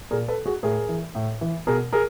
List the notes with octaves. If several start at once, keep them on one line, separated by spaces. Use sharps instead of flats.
A#2 G#4 A#4
A4 B4
F#4 G#4
A2 G#4 A#4
E3
A2
E3
B2 G#4 A#4
G#4 A#4